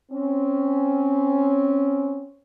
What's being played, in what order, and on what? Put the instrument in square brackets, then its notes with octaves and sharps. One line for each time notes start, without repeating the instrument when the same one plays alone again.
[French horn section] C4 C#4